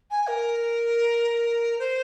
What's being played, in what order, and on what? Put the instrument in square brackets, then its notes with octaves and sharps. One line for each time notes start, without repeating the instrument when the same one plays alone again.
[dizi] G#5
A#4
C5